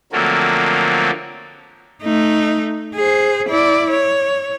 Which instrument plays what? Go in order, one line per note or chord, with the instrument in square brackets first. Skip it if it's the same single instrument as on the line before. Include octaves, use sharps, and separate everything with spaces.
[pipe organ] D3 F3 F#3 A3 A#3 C4
[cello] A3 D#4
G#4 C5
E4 D5
C#5